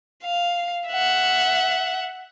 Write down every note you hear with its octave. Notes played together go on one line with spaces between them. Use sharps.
F5
E5 F#5